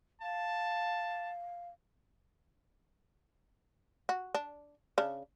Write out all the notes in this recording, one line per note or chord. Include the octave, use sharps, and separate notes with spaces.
F5 A5
F#4
D4
C#3 D4